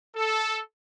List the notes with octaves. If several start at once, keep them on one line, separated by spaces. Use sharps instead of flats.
A4